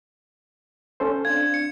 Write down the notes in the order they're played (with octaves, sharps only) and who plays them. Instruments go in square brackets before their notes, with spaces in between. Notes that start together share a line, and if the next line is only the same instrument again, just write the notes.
[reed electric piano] C#4 A4 C5
[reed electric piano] C4 D4 F5 [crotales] G#6
[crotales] C#7